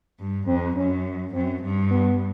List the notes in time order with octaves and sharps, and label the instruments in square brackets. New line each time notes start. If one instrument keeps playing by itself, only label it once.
[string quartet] G2
[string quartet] F2 [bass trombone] C4
[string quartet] F#2 [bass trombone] C#4
[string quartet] F#2 [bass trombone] C4
[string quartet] G2
[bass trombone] B3